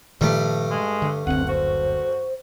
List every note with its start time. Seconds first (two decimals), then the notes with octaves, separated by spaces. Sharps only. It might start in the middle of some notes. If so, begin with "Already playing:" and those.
0.21 G2 A#2 D#3 F3 A3
0.71 G#3
1.02 D3
1.27 F#1 D2 C4 F#5
1.48 F#4 C5